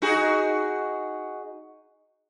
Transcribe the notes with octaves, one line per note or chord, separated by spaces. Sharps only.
D#4 F#4 G#4